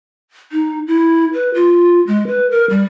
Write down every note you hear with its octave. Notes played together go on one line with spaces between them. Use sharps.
D#4
E4
B4
F4
G#3
B4
A#4
G3